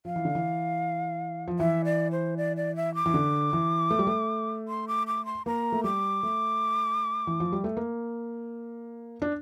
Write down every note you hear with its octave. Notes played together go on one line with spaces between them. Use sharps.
F3 F5
E3
D3
E3
F3
E3 E5
D5
C5
D5
D5
E5
D6
E3
D3
E3
A3
G3
A3
C6
D6
D6
C6
A#3 A#5
A3
G3 D6
A3
E3
F3
G3
A3
A#3
D4